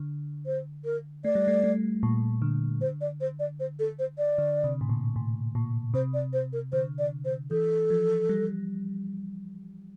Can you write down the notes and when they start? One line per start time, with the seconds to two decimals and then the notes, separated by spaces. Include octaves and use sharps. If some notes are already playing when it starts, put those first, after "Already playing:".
Already playing: D3
0.46 C5
0.85 A#4
1.25 A3 D5
1.35 G3
1.48 A3
1.64 A3
2.03 A#2
2.42 D3
2.81 C5
3.01 D5
3.21 C5
3.39 D5
3.60 C5
3.79 A4
3.99 C5
4.18 D5
4.38 D3
4.64 C3
4.81 A2
4.89 A#2
5.16 A2
5.55 A#2
5.94 C3 C5
6.14 D5
6.33 C5
6.53 A#4
6.72 D3 C5
6.99 D5
7.25 C5
7.51 E3 A4
7.90 F3
8.29 G3